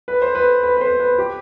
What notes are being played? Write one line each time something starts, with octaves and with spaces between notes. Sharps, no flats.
B4
C5
B4
B4
B4
C5
B4
G4